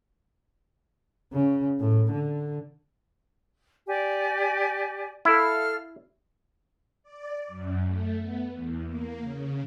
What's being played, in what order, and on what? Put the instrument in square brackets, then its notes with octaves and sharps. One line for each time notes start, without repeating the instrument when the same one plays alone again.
[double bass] C#3
A2
D3
[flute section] G4 D5 G#5
[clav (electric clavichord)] E4 [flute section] A4 F5 F6
[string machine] D5
F#2
A3
B3
E2
A#3
C#3